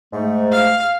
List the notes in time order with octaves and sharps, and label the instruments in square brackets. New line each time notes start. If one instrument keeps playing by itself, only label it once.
[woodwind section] G#2 A3
[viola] F5